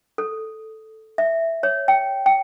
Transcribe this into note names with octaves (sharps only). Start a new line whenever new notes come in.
A4
E5
C#5
G5
G5